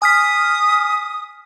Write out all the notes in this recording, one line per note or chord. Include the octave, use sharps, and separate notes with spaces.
G#5 D#6 F6 B6